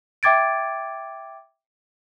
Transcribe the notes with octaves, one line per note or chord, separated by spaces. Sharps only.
E5 G5 D6 G#6 A6 D7